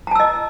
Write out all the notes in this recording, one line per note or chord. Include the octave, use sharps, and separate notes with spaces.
D#5 A5 A#5 E6